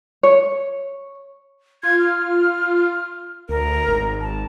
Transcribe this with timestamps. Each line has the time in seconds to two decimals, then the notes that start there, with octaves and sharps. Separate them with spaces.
0.23 C#5
1.83 F4 G#6
1.99 F6
3.49 D2 A#4
3.88 G#1
4.21 A5